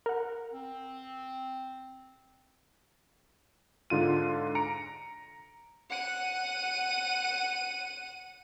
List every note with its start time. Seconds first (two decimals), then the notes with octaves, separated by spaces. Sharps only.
0.06 A#4 F#5
0.53 C4
3.90 G#2 D3 F4 D#7
4.55 A#5 C#7 D7
5.90 F#5 D#7